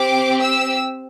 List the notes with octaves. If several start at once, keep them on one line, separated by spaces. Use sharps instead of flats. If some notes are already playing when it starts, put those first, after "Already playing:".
Already playing: C4 G4 D6
E6